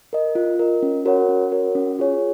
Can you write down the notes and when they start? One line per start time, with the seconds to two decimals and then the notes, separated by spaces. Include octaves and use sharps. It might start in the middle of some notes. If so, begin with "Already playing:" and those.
0.13 A#4 D#5
0.35 F4
0.59 A#4 D#5
0.83 C#4
1.05 F#4 A#4 C#5 F#5
1.29 C#4
1.52 F#4 A#4 C#5 F#5
1.75 C#4
1.99 F4 G#4 C#5 G#5